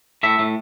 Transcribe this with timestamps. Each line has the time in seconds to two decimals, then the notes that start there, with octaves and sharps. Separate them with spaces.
0.23 A2 E5
0.39 A2